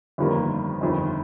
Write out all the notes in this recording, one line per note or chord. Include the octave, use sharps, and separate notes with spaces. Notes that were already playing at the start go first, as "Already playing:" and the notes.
G1 F2 D#3 G3 A#3
G1 F2 D#3